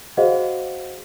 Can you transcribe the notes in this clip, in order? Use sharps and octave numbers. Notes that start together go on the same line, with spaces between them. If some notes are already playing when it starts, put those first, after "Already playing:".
F#4 G#4 C5 D#5 F5 F#5